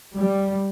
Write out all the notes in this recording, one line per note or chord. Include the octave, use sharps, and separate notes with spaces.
G3